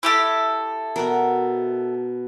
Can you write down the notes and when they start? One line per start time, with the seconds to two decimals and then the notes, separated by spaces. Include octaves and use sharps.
0.03 E4 G4 A4
0.96 B2 F#4 A#4